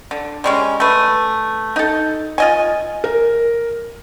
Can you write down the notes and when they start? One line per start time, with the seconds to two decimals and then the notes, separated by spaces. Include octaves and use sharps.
0.11 D3
0.44 G3 G#3 C#4
0.80 A3 B4
1.76 D#4 A4
2.38 F4 D#5 G#5
3.04 A#4